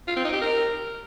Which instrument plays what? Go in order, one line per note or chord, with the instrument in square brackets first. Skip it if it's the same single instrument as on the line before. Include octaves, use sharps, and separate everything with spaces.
[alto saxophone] F4
C4
D#4
G4
A#4